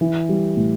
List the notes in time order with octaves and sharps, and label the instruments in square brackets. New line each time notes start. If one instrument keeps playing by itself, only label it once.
[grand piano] E3
G3
A2